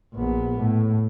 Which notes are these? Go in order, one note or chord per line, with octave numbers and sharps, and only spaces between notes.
A#1 B3
A2